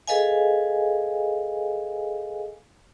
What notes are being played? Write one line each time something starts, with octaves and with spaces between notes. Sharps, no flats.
G#4 A4 B4 D#5 F5 G#5